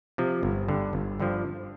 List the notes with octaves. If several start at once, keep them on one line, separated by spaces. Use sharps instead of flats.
C3 F3
G1
G2 D3
G1
G2 D3 F3